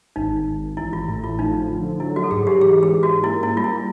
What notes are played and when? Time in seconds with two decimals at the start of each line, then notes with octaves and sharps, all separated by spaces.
0.16 G#1 D#4
0.46 G#1
0.77 A1 E4
0.93 F4
1.08 A2 E4
1.24 F4
1.39 F3 D#4
1.69 D3
2.00 F#3 E4
2.16 F#4
2.24 A4
2.31 G#2 G#4
2.47 G4
2.61 E3 G#4
2.83 G#4
2.92 G#2
3.03 F#4
3.23 A#3 E4
3.43 E4
3.54 G3 F4
3.64 E4